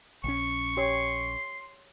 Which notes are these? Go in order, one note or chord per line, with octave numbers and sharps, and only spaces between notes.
A#1 D#3 C#4 C#6
G4 C#5 C6